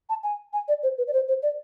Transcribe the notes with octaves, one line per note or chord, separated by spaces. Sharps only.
A5
G#5
G#5
D5
C5
B4
D5
C5
C5
D5